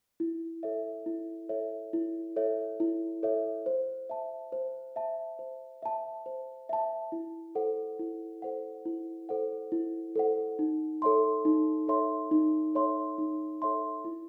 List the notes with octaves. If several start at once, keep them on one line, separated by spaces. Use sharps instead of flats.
E4
A4 C#5 E5
E4
A4 C#5 E5
E4
A4 C#5 E5
E4
A4 C#5 E5
C5
E5 A5
C5
E5 A5
C5
E5 A5
C5
E5 A5
E4
A4 C5 F#5
E4
A4 C5 F#5
E4
A4 C5 F#5
E4
A4 C5 F#5
D#4
A4 C#5 E5 C6
D#4
A4 C#5 E5 C6
D#4
A4 C#5 E5 C6
D#4
A4 C#5 E5 C6
E4